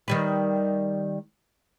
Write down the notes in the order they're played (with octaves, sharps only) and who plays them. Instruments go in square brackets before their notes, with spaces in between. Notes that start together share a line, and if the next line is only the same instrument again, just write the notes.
[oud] D#3 G3 B4